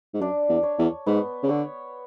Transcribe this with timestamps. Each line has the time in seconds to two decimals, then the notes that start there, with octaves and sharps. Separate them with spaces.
0.14 G#2
0.21 F#2 D4
0.49 E2
0.63 C#5
0.79 E2
1.07 G#2 B3
1.43 C#3
1.49 D3 C#5